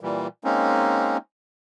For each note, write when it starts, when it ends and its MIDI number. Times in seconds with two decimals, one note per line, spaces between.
0.01 0.27 46
0.01 0.27 52
0.01 0.27 55
0.44 1.17 56
0.44 1.17 58
0.44 1.17 60
0.44 1.17 61
0.44 1.17 63